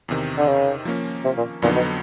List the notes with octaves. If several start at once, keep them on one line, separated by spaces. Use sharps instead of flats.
E2 C3 D#3
D3
C#3
F3 A#3 C#4
C3
A#2
F2 A#2 D3 F#3 B3 D#4
B2